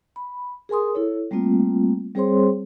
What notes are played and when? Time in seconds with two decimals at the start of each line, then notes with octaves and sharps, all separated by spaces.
0.16 B5
0.69 G#4 A#4 G#5 C6 D#6
0.95 E4 A4 C#5
1.31 G3 A3 A#3 C4 F4
2.15 G3 C4 G#4 C5 C#5 C6